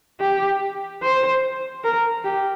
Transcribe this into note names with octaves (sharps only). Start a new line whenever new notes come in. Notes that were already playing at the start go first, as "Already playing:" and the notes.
G4
C5
A#4
G4